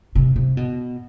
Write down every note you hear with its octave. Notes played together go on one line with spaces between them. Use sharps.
C3
C3
B2